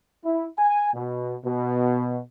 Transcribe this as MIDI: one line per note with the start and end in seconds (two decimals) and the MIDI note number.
0.25 0.46 64
0.59 0.91 80
0.94 1.35 47
1.45 2.20 47